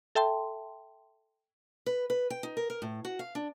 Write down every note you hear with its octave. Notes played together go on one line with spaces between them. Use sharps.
A4 E5 G5 A5 C6
B4
B4
G5
D#4
A#4
A#4
A2
F#4
F5
D4